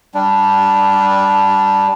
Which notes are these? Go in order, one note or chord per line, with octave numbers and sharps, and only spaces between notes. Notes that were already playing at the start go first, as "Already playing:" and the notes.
G3 D4